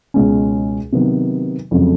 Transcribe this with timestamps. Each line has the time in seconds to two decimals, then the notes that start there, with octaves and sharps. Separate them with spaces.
0.14 C#2 B2 G#3 C#4
0.92 C3 D#3 F#3 B3
1.71 F2 C#3 F#3 A3 C4